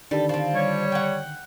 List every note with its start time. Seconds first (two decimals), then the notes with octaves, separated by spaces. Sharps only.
0.11 D3 D#3 G3 A4
0.29 F3 C4
0.54 G3 C#5
0.92 F#5 G5